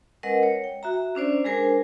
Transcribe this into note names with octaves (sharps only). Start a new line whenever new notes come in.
G#3 C#4 A#4 B4 D#5 F#5
C#5
G5
F#4 E5 A#5
C#4 D4 C5 D5
G#3 D4 G#4 A#4 C5 G#5